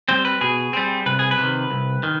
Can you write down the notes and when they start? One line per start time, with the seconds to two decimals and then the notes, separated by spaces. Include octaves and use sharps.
0.08 G3 C4 C5
0.25 B4
0.41 B2 G#4
0.73 G3 C4
1.06 C2 B4
1.19 G#4
1.31 B4
1.38 C3 D#3
1.70 C2
2.03 D#3